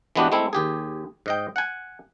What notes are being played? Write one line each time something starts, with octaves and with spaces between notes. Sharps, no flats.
E3 G#3 B3 D4 F#4 G4
G#3 A3 C4 E4
D#2 G4 G#4
G#2 D#5 G5
F#5 G#5